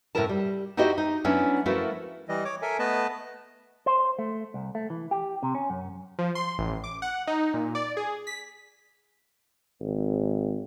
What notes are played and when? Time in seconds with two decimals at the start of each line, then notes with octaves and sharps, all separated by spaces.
0.15 A2 C3 C#4 E4 A#4 A5
0.29 G3
0.77 D#4 E4 F#4 G4 C5 D#5
0.98 D#4
1.24 F#3 B3 C#4 D4 E4
1.66 F3 A3 E4 F#4 A#4 B4
2.28 E3 G3 D#5
2.44 C#5 D6
2.62 A4 A#4 E5 G#5
2.79 A3 B3 B4 D#5 A5
3.86 C5
4.19 A3
4.54 C2
4.75 A3
4.90 E3
5.11 G4
5.43 C3
5.55 C#4
5.70 F#2
6.19 F3
6.35 C6
6.59 A1
6.84 D6
7.02 F#5
7.27 D#4
7.54 A#2
7.75 D5
7.97 G#4
8.27 B6
9.80 G#1